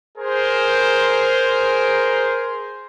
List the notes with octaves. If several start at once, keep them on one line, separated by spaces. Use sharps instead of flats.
G#4 A#4 C5